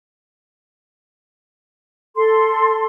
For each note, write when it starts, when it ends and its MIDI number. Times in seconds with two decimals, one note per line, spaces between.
2.15 2.86 69
2.15 2.86 84